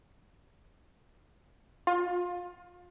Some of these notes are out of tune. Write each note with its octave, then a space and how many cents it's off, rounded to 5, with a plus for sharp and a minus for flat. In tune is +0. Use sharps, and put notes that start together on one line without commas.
F4 +25